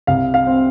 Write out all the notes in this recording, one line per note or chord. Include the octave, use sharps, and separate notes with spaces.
C2 F5
F5
C4